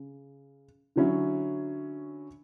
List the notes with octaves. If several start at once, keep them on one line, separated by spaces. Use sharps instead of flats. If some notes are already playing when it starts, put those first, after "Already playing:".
Already playing: C#3
D3 F#3 C#4 E4